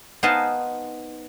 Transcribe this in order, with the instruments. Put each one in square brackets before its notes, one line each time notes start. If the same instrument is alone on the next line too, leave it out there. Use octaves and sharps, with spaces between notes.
[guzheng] B3 D#4 C5 F5 G#5 A5